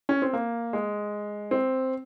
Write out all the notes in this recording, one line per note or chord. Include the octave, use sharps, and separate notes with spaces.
C#4
C4
A#3
G#3
C4